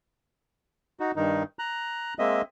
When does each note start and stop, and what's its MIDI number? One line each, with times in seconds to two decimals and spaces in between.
1.00 1.12 63
1.00 1.12 66
1.16 1.43 43
1.16 1.43 51
1.16 1.43 63
1.59 2.14 82
1.59 2.14 90
2.19 2.42 56
2.19 2.42 58
2.19 2.42 60
2.19 2.42 75
2.19 2.42 76